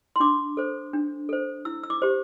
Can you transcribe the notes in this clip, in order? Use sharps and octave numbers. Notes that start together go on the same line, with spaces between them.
C6
D4 D6
A4 C5
D4
A4 C5
E4 E6
E6
D6
G4 C5